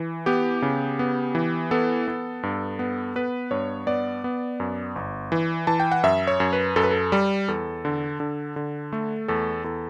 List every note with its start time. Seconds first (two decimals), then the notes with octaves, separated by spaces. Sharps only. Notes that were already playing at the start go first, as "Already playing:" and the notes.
Already playing: E3
0.26 B3 G4
0.62 C#3
0.99 B3
1.35 E3
1.71 B3 A4
2.08 B3
2.43 G2
2.79 B3
3.16 B3 B4
3.51 G2 C#5
3.87 B3 D5
4.24 B3
4.60 F#2
4.96 G1
5.32 E3
5.67 E3 A5
5.80 G5
5.92 F#5
6.03 F#2 E5
6.27 C#5
6.40 F#2
6.53 B4
6.76 F#2 A4
6.83 B4
6.91 A4
7.12 G3
7.48 E2 A4
7.85 D3
8.20 D3
8.56 D3
8.93 A3 A4
9.28 E2 A4
9.64 E2 A4